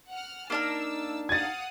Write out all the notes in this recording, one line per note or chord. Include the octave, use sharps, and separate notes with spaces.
F#5 F6
A#3 D4 D#4 A#4 A5 E6
F5 F#5 D#6 G#6 A6